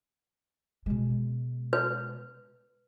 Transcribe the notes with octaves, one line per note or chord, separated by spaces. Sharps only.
B2 G#3
B4